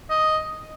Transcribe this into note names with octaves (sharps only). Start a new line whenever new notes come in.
D#5